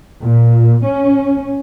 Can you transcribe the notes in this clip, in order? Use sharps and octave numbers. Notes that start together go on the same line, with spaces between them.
A#2
C#4